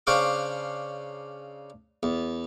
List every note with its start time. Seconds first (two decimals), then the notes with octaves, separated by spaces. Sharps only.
0.07 C#3 D4 C5 F5 C#6 D6
2.03 E2